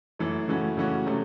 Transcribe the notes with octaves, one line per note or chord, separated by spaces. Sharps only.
F#2 E3 A3
C#3 E3 A3 C#4 F#4
C#3 E3 A3 C#4 F#4
C3 F#3 A3